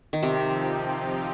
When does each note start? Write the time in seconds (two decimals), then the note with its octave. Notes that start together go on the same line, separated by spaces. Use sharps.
0.13 D#3
0.22 C3 F3 C4 D#4 G4